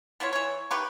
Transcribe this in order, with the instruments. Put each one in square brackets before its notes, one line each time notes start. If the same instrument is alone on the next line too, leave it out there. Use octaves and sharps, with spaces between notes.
[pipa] B3 E4 F4 C#5
E3 C#5
D#3 G4 B4 C#6